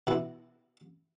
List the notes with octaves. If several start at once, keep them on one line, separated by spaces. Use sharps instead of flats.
B2 E4